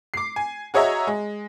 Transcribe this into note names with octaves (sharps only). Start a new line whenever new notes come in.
D6 C7
G#5
F#4 G#4 C#5 D#5 E5 A#5
G#3